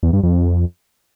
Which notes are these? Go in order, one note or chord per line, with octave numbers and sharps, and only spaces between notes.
E2
G2
F2